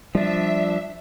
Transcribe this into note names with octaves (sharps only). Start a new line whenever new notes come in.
F3 G3 D4 E5